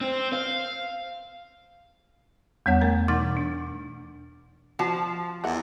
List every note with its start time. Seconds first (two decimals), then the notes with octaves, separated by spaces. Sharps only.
0.01 C4
0.33 F5
2.66 E2 G3 B3 C#5 F#5 G6
2.81 A3 A#4 A#5
3.08 B2 E3 D#4 F#5 D6 A6
3.37 D4
4.79 F3 F#4 A5
5.44 E2 E4 A#4 F#5